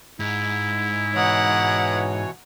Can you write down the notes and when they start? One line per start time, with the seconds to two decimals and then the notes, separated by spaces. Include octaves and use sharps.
0.20 G#2 E4
1.14 B2 E3 C#5 F#5 A#5 D#6